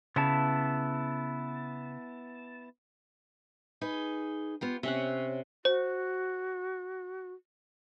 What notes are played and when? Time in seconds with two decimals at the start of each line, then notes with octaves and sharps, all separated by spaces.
0.16 C#3 B3 E4 A5
3.81 D#4 G#4 B4
4.61 B3 F4 G4
4.83 C3 C#4 C#5 F#5
5.65 F#4 C5